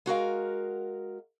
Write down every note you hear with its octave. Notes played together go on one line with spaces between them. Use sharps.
G#3 F#4 A#4 F5